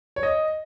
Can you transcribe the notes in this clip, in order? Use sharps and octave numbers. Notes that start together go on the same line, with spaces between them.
C#5
D#5